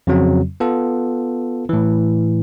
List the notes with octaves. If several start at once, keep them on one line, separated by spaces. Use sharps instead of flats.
F2 C#3 F#3 C4
B3 F4 A4
A2 E3